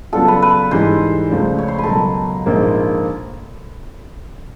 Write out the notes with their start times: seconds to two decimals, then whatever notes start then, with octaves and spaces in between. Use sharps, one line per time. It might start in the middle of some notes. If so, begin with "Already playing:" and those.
0.12 C#3 F#3 B3 D4 F4 A4
0.28 B4
0.42 B4
0.71 G#2 E3 G3 C5
1.30 C#2 C#3 F3 A3 D4
1.58 C#5
1.68 C5
1.78 B4
1.84 C#2 B2 F#3 A4 A#4
2.46 A#1 G#2 F3 A#3